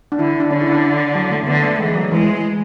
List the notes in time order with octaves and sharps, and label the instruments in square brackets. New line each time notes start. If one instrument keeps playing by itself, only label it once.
[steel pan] D4
[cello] D3 [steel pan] E4
[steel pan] D4
[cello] D3 [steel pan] C#4
[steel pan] E4
D4
F#3
A3
[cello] D3 [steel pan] B3
[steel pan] A3
[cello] E3 [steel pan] G#3
[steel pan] F#3
[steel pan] E3 [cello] G#3